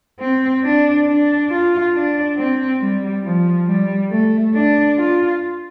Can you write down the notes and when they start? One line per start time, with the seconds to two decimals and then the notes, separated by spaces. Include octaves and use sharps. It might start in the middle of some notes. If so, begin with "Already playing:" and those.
0.20 C4
0.63 D4
1.07 D4
1.50 F4
1.94 D4
2.37 C4
2.80 G3
3.24 F3
3.67 G3
4.10 A3
4.54 D4
4.97 F4